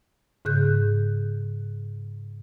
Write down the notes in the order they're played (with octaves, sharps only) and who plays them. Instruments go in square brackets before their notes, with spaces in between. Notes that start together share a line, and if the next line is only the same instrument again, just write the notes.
[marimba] G#2 C#3 G#4 F#6 G6